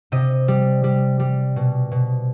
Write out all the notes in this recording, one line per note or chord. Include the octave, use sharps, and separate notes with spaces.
C3 D#5
G3
G3
G3
B2
B2